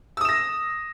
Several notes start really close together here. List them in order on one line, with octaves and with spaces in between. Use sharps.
E6 D#6 E7 A#6